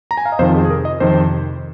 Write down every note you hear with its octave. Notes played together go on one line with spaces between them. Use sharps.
A#5
G#5
F5
D#5
F2 C3 D#3 C5
F4
G#4
G#4
A#4
D#5
F2 C3 D#3 C5